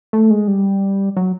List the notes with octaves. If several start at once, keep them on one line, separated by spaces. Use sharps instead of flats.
A3
G#3
G3
F#3